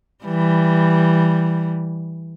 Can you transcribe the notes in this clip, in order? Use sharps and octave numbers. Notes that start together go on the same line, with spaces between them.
E3 G3